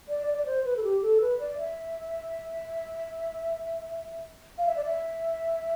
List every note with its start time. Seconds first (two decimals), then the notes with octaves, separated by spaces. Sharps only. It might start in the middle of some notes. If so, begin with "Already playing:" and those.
0.09 D5
0.27 D5
0.38 D5
0.46 C5
0.65 B4
0.77 A4
0.83 G4
1.02 A4
1.21 B4
1.39 D5
1.58 E5
4.58 F5
4.67 E5
4.76 D5
4.85 E5